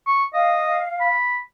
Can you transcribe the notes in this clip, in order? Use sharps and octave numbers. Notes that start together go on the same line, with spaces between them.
C#6
D#5 F5
B5